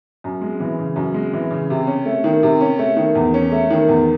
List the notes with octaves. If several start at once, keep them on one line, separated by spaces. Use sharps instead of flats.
F#2
G#3
E3
C#3
F#2
G#3
E3
C#3
C3
C#4
A3
D#3
C3
C#4
A3
D#3
E2
C#4
A3
D#3
E2